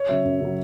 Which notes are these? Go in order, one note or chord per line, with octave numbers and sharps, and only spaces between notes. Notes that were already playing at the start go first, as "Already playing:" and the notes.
Already playing: C#5
C#3 F#3 E5
F#2
C#3 F#3